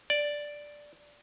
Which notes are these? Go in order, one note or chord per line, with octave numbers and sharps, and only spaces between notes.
D5